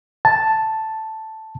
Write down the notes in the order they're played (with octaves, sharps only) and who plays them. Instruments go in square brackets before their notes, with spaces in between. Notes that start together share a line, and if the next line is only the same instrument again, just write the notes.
[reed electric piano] A5